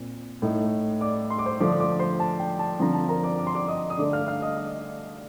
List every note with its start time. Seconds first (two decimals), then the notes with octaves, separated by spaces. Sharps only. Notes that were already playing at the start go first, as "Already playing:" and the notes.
Already playing: A#2 C4
0.42 A2 A3 D#4
1.01 D5 D6
1.30 C6
1.39 D6
1.46 C5 C6
1.60 D3 F3 A3 D4 D5 D6
1.80 D5 D6
1.99 C5 C6
2.20 A5
2.39 G5
2.59 A5
2.79 D3 F3 C4 A#5
2.94 A5
3.09 A#4 A#5
3.24 D5 D6
3.38 D6
3.47 C6
3.55 D5 D6
3.68 D#5 D#6
3.90 D#6
3.97 D3 A3 D4 D5 D6
4.13 F5 F6
4.28 F5 F6
4.42 D#5 D#6
4.57 D#5 D#6